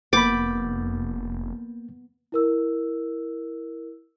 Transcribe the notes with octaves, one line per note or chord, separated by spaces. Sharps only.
F1 A#3 B3 B5 D6 G6 A6
E4 A#4 E6